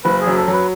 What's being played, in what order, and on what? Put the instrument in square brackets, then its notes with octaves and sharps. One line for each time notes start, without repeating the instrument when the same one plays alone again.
[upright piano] F#1 [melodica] B4
[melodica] G#4
[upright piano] F#2
[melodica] A4
[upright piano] F#3
[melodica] B4